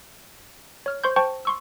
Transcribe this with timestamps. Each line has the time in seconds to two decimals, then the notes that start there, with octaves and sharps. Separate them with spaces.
0.86 C#5 F6
1.04 C5 C6 C#6 G6
1.16 C5 G5 A5 C#6
1.45 C6 C#6 E6